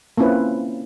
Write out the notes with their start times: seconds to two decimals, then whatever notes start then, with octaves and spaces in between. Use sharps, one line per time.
0.18 A#3 C4 C#4 E4 F4 B4